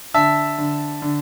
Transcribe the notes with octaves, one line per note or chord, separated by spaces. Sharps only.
D3 E5 A5
D3
D3